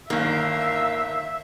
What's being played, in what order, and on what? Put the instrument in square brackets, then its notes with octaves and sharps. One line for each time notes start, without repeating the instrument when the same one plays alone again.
[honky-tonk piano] G1 D#3 [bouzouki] A#3 [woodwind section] A#4 F5 [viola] E5